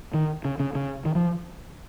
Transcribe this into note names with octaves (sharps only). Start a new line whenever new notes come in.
D#3
C#3
C#3
C#3
D#3
F3